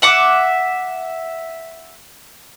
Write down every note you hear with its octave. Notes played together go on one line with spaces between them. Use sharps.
E5 F#5 D6